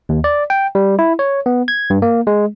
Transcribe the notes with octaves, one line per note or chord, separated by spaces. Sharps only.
D#2
D5
G5
G3
E4
C#5
B3
G#6
G2
A#3
G#3